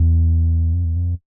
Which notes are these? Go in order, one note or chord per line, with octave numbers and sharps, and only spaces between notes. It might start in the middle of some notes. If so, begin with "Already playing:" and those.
Already playing: E2
F2
E2
F2